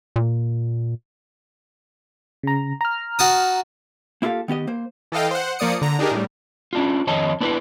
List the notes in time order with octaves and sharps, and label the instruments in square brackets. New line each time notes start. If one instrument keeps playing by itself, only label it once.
[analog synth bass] A#2
[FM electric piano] C#3 A#5
A#5 F6
[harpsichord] F#4 A5 D#6
[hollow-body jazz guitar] A#3 E4 F4 G4 A4 F5
D#3 B3 G4 D#5
A#3 C5
[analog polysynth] E3 A4 D#5 F5 G5
C5 F#5
F3 A#3 D5 D#6 C#7
D3 A#5
D4 D#4 G4 G#4 A#4
A2 G3
[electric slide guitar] C#4 D4 F4
F2 D#3 C#5 D#5 A5
B3 D4 E4 B4